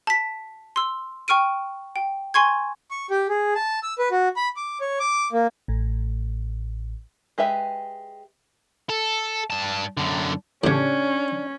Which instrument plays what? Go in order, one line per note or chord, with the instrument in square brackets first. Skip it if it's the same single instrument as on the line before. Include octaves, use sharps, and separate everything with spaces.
[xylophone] A5 B6
C6 E6
G5 C#6 F6 D7 D#7
G5
G#5 C6 C#6 G#6
[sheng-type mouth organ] C#6
G4
G#4
A5
E6
B4
F#4
B5
D6
C#5
D6
A#3
[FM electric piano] A1 A2
[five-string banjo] G#3 G4 B4 E5 G5
[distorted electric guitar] A4
G2 A5
F#2 D3
[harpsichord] A2 C#3 [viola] C#4 [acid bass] D4 [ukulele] G4 C#5